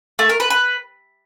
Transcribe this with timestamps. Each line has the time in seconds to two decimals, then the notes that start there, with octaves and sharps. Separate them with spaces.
0.19 A3
0.29 A#4
0.40 B4
0.50 B4